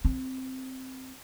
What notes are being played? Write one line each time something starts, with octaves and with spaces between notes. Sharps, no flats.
C4